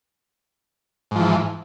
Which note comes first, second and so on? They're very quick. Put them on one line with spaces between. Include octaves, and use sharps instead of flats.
G#2 F3 E3